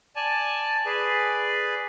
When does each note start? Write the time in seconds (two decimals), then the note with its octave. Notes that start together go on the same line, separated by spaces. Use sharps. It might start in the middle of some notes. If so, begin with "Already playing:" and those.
0.16 D5 G#5 A5
0.86 G#4 B4 D5